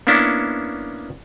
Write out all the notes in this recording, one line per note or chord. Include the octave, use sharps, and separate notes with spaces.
A#3 B3 C#4 D4 E4